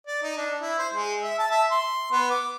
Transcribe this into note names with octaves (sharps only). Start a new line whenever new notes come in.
D5
D#4
D4
E4
C5
G#3
E5
A5
E5
C6
B3
D6